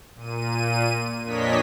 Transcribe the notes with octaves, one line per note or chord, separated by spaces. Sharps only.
A#2 D#7
F2 A#2 D4 C#5 D#5 B6